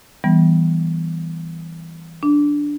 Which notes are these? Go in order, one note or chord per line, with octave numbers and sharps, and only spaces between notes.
E3 G3 B3
D4